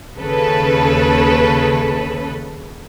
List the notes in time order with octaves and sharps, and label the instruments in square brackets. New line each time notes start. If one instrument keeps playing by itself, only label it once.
[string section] D#2 C#3 A4 B4